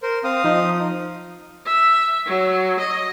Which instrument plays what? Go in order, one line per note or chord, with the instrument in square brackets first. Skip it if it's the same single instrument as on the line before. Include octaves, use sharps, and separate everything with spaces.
[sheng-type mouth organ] A#4 C5
[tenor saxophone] C4 [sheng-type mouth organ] F5 D#6
[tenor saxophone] F3 [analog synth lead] D#4
[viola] E5
F#3
D#5